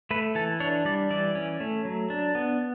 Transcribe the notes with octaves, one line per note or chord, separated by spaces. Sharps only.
A3 B4
E3 A4
D4 C#5
G3 D5
E3 D5
C#4
A3
F#3
D4
B3